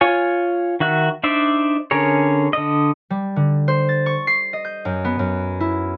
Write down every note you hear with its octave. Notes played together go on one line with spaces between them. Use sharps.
F4 C#5 G#5
D#3 F#4 E5 F#6
D4 D#4 C5 D5 E5
D3 C#4 G#4 A#4 C#5
D3 D#5
G3
D3
C5
A6
C#6
C7
D#5
G6
F#2
B3
F#2
E4